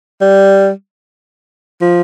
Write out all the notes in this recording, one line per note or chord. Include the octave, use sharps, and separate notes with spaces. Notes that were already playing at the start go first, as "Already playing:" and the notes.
G3
F3